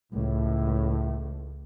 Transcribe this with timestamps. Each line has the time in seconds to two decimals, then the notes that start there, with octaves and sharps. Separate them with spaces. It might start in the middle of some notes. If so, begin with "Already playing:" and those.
0.13 C#2 A2